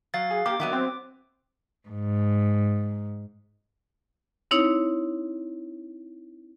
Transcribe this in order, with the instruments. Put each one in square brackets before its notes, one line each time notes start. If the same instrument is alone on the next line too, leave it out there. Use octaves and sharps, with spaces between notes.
[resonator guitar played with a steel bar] F#3 [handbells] F5 A6
[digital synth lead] G#4
[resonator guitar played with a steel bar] A#3 [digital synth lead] G4 [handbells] D6
[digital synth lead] D#3 [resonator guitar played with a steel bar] F#3 B3 E5 [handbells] D6
[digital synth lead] C4
[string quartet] G#2
[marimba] C4 D#4 E4 C#5